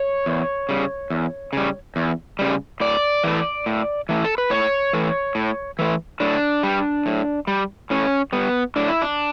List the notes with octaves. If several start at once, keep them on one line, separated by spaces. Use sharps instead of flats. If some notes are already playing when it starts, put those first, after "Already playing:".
Already playing: C#5
E2
C#3 G3
E2
C#3 G3
E2
C#3 G3
A2 D5
E3 A3
A2
E3 A3
A4
B4
A2 C#5
E3 A3
A2
E3 A3
A2 D4
G3
A2
G3
A2 C#4
G3 B3
A2 D4
E4
D4